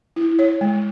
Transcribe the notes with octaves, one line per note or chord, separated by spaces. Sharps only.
E4
C#5
G#3